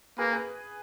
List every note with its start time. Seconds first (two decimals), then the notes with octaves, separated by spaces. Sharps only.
0.18 A#3 G#4 B4
0.32 G#4 B4